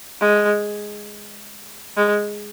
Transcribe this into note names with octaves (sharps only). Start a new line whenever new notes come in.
G#3
G#3